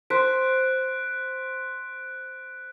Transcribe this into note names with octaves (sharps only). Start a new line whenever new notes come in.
C5 F#6 B6 D7